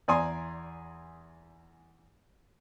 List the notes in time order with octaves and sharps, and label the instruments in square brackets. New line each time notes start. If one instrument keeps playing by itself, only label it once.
[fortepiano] E2 D5 G#5 A#5 C6 D#6